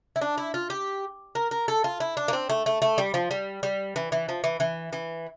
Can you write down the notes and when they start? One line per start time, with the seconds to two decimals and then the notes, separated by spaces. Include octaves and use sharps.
0.16 E4
0.21 D4
0.38 E4
0.54 F4
0.70 G4
1.35 A#4
1.51 A#4
1.68 A4
1.84 F4
2.00 E4
2.17 D4
2.28 A#3
2.33 C4
2.50 A3
2.66 A3
2.82 A3
2.98 G3
3.14 F3
3.31 G3
3.63 G3
3.96 E3
4.12 E3
4.29 F3
4.44 E3
4.60 E3
4.93 E3